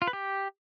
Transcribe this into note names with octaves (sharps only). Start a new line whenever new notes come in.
F4
B4
G4